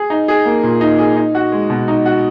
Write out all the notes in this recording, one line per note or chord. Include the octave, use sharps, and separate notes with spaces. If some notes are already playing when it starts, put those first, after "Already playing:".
Already playing: G#4
D#4
G#4
A#3
A#2
D#4
G#4
D#4
F#4
G#3
B2
D#4
F#4